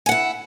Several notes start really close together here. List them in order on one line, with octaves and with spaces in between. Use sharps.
G#5 F#5 E4